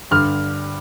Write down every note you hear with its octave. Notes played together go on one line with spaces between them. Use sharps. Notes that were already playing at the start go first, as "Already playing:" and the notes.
G2 D3 F6